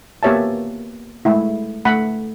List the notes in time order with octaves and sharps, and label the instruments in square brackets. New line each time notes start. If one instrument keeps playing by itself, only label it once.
[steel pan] A#3 B3 G4 C#5 E5 A5
G#3 A3 E4
A3 F#5 B5